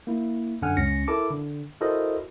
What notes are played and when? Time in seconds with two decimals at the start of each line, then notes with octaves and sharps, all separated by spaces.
0.07 A#3 E4
0.62 F#2 D3 F#5 G#5 F6
0.77 C#2 C#4 A#6 C#7
1.08 E4 A4 A#4 A5 D6
1.31 D3
1.81 E4 F#4 A4 A#4 C5 D#5